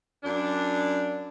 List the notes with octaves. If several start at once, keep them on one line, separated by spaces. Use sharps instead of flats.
F#2 D4